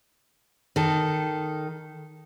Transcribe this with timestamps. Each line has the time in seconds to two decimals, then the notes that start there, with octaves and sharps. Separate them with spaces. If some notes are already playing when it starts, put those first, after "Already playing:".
0.76 D#3 A4